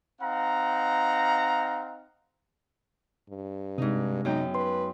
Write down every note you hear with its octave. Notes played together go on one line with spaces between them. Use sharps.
C4 D#4 F5 F#5 A#5
G2
G#2 C3 D#4
F#2 B3 D#4 G5
B4 C6